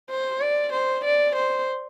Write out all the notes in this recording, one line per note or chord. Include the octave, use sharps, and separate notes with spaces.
C5
D5
C5
D5
C5